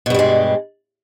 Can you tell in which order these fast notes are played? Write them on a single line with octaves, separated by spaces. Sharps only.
B2 G2 G3 G#3